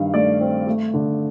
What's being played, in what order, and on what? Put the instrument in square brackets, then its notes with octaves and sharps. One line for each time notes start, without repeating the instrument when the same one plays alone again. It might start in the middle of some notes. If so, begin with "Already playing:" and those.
Already playing: [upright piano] G2 D#3 F5
A3 D5
C4
A3
D3